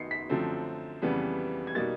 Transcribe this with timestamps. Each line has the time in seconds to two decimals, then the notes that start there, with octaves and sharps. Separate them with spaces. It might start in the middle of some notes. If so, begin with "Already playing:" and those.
Already playing: D#3 B3 D#4 C7 C#7
0.11 B6
0.30 F#2 D3 F3 A3 C4
1.02 F2 C#3 E3 G3 B3
1.67 G#6
1.75 B2 G3 A#3 D#4 A6